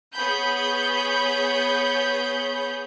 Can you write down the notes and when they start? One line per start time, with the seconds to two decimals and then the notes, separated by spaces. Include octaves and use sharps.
0.14 B3 G#4 C#5 B5 G6